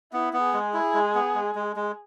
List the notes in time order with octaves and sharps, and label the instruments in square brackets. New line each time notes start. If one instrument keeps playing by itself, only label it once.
[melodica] B3 [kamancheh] E4
[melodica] B3
[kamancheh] G#4
[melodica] G#3
E4
G#3
B3
G#3
G#3
G#3